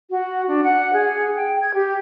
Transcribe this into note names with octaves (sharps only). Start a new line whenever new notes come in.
F#4
D4
F#5
G#4
G5
G#6
G4